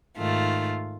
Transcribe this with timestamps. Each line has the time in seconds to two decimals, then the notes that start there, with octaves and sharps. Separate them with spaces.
0.17 G#2 D#3 A3 F4